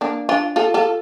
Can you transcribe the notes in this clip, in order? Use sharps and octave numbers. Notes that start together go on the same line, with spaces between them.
A#3 D4
D4 F4
F4 A4
F4 A4